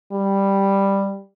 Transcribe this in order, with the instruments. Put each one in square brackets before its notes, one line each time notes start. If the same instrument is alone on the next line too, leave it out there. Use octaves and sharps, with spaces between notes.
[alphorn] G3